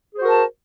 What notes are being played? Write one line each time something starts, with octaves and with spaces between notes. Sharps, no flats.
F#4 G#4 A#4 C5 A5